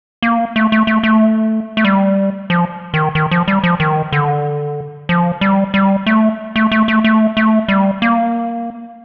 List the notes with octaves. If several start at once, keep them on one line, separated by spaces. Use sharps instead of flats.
A#3
A3
A3
A3
A3
A3
G3
F3
D#3
D#3
F3
G3
F3
D#3
D3
F3
G3
G3
A3
A3
A3
A3
A3
A3
G3
A#3